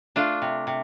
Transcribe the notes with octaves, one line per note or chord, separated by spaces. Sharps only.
A3 D4 F4
C3
C3